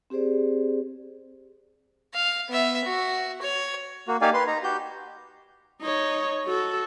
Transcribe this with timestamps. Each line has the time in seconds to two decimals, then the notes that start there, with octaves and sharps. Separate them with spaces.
0.10 C4 G4 G#4 C5 D5
2.14 F5
2.49 B3 E5
2.84 F#4
3.42 C#5
4.08 A#3 F#4
4.21 A#3 D#4 G4 D5 F5 G#5
4.34 B4 C6
4.47 D#4 A#5
4.64 F#4 G4 G6
5.82 D#4 C#5
6.45 F#4 A4